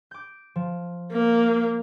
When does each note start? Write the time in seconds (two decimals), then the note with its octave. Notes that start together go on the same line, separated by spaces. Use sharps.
0.11 D6 G6
0.56 F3
1.11 A#3